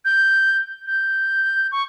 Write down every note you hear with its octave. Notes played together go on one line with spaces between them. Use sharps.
G6
G6
C#6